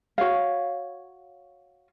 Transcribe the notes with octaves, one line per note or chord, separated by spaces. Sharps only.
F#4 C#5 F5